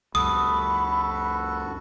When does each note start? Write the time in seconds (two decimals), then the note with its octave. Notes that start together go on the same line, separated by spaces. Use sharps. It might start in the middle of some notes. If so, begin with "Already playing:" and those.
0.15 C#2 F#2 C#3 F#4 A4 B5 D#6